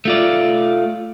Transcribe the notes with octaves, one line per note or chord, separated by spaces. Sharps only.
A3 F4 D5